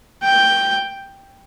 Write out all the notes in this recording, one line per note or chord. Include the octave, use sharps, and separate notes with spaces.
G5